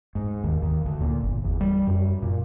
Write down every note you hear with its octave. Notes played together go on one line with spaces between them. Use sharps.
G#2
D#2
D#2
D2
A#2
G1
E2
G3
F#2
A#2